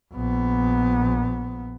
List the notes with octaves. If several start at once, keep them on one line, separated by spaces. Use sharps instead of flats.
A#1 B3